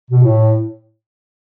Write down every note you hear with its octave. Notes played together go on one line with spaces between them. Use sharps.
B2
A2